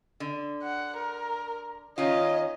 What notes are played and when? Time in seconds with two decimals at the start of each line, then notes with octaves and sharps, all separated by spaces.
0.20 D3
0.63 F#5
0.97 A#4
1.98 D#3 C#4 F4 C#5 D#5